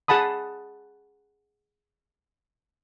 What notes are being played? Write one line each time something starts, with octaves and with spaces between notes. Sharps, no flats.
G#4 F#5 A5 B5 D#6